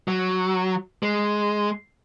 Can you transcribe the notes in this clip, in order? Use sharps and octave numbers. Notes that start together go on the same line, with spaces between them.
F#3
G#3